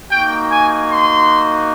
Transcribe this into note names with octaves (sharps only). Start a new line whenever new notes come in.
A#3 D#4 F#4 G5
G#5
C6